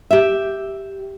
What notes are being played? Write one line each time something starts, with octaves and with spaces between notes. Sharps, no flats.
G4 E5